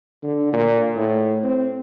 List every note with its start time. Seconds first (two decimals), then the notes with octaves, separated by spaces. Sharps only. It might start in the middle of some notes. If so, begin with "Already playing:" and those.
0.23 D3
0.53 A#2
0.96 A2
1.44 C4